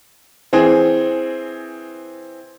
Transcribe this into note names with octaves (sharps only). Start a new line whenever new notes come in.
E3 C4 G#4